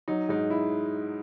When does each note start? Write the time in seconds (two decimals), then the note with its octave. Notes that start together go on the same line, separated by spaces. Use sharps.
0.08 F#3 D#4
0.29 G#2 D#4
0.50 E4